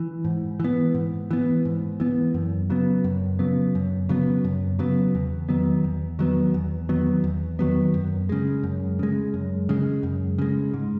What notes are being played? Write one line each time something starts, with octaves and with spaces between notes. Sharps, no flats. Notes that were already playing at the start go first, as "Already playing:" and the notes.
Already playing: E3
G#2
E3 B3
G#2
E3 B3
G#2
E3 B3
F#2
C#3 F#3 B3
F#2
C#3 F#3 B3
F#2
C#3 F#3 B3
F#2
C#3 F#3 B3
E2
D#3 F#3 B3
E2
D#3 F#3 B3
E2
D#3 F#3 B3
E2
D#3 F#3 B3
F#2
C#3 G#3
F#2
C#3 G#3
F#2
C#3 G#3
F#2
C#3 G#3
G#2